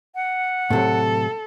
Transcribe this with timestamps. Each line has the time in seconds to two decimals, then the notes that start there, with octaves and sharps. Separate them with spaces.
0.15 F#5
0.70 A2 C3 F#3 A4